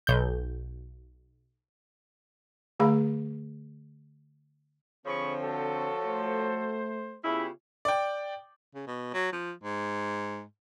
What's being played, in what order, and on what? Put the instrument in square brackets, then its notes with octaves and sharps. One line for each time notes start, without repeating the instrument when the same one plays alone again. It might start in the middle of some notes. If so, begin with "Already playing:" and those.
[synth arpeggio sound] B1 G6
[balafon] D3 A3 G#4 F5 B5
[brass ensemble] D3 C4 [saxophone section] F3 C#5 [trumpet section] G#4 B5 C#6
[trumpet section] F#4 A4
[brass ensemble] A3 C5
[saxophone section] C#3 E4 [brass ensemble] B3 F4 G4
[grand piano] D5 G5
[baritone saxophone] C#3
B2
F#3
F3
G#2